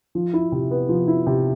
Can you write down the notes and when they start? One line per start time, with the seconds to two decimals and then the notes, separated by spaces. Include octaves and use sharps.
0.15 F3
0.33 E4
0.52 C3
0.71 B3
0.89 F3
1.08 E4
1.27 C3